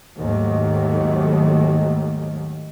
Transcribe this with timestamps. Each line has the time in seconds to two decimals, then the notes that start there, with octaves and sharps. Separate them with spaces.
0.17 D#2 G#2 D#3 F#3 A3